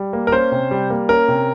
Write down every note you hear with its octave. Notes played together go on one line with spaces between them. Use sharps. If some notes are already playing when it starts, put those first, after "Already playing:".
Already playing: G3
A#3
A#4
C#4 C5
C3
G3
A#3
C#4 A#4
C3